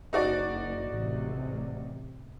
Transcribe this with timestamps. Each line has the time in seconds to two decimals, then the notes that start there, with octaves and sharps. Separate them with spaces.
0.13 F#1 D#4 F#4 D5
0.88 A1 C3